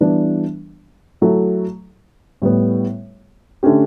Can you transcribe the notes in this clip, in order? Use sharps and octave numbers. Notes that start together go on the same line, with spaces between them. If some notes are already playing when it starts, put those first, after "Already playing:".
E3 G3 B3 D4
F#3 A3 E4 A4
A2 G3 B3
D3 A3 C#4 G4